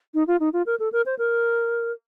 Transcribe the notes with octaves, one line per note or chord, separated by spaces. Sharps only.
D#4
F4
D#4
F4
A#4
A4
A#4
C5
A#4